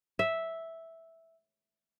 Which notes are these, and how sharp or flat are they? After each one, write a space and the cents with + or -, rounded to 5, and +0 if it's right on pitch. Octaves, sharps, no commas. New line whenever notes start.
E5 -5